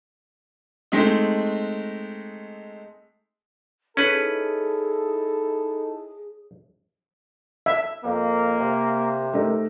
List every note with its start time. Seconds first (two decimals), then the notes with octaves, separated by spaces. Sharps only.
0.92 G#3 A3 C4 D#4
3.97 C#4 D#4 E4 G#4 A4 B4
7.66 E5
8.04 F2 A#3
8.60 C3
9.33 A3 D#4 A#4